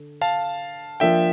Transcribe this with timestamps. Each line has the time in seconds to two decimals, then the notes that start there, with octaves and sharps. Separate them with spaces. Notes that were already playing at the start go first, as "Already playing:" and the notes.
Already playing: D3
0.21 F5 A5
1.00 F3 A#3 D4 E5 G5